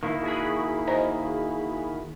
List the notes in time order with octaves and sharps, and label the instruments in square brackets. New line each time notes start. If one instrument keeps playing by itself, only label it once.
[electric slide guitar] D#3 A#3 E4
[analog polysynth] F#4 G#4 B5
[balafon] C5 D#5 A#5